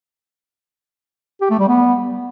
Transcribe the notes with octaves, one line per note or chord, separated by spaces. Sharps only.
G4
A3
G3
B3